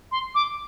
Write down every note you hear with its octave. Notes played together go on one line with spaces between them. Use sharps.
C6
D6